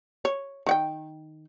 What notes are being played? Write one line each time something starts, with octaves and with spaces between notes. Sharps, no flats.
C#5
D#3 F#5 G5